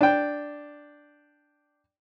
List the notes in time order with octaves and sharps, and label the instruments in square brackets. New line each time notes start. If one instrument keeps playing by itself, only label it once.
[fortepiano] D4 G5